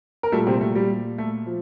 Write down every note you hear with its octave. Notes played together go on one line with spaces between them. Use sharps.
A#4
A#2 G3 A3 A4
C3 C4
A3
G3
A3
F3